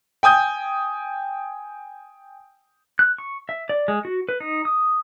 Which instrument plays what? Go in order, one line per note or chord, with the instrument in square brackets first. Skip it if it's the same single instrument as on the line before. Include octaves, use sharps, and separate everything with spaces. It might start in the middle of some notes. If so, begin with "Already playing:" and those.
[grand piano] G5 G#5 D#6 G6
[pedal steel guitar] F#6
C#6
E5
D5
G#3
F#4
B4
D#4
D#6